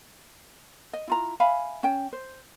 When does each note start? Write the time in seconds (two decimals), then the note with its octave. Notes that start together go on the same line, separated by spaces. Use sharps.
0.93 D#5
1.08 E4 F4 A#5
1.40 E5 F5 G#5 B5
1.83 C#4 G5
2.13 C5